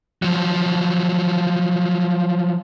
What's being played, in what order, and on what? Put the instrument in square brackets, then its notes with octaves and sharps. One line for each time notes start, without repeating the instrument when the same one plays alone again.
[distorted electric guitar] F3 F#3